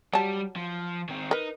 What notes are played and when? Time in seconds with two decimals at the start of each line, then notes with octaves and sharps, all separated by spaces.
0.13 F#3 G3 A5
0.56 F3
1.09 D#3 C4
1.31 D#4 A#4 B4